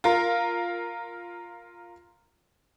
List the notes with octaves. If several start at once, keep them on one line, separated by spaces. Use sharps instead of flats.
F4 A#4